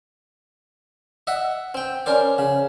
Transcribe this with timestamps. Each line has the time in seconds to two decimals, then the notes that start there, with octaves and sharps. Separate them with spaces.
1.27 D#5 E5 F#5
1.74 C4 G5
2.06 C#4 A#4 C5 D5
2.38 C#3